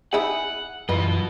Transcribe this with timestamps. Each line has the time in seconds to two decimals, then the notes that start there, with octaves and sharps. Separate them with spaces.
0.13 D#4 E4 G#4 F#5
0.89 F#2 E3 F4 F#4 B4 D#5